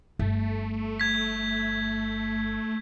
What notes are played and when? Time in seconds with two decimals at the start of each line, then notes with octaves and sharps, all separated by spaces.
0.19 G1 A3
1.00 G#6 B6